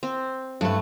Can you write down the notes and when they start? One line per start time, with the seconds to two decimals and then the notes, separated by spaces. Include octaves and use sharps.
0.03 C4
0.61 G2 A3 B4